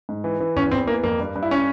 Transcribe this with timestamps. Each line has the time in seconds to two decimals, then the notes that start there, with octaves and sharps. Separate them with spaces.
0.09 G#2
0.24 E3
0.40 E3
0.56 E2 C#4
0.71 E2 C4
0.87 E3 A#3
1.03 F2 A#3
1.20 G2
1.36 G2
1.43 E4
1.51 C#4